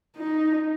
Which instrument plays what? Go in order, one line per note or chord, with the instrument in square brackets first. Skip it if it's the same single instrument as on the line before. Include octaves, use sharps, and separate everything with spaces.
[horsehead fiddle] D#4